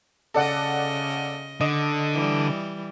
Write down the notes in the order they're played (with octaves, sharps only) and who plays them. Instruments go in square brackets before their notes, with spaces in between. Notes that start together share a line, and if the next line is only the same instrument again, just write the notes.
[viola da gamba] C#3 D#5 [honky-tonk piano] A4 D5 F#5
[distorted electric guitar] D3 [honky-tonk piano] D#5
[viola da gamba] E3 G3